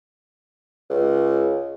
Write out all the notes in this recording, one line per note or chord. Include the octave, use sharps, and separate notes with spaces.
C#2